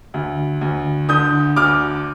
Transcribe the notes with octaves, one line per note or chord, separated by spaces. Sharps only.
D2
D2
D3 D#6 G6
D2 D6 F6